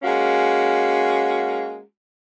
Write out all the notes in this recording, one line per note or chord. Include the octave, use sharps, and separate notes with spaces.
G#3 A#3 C#4 F#4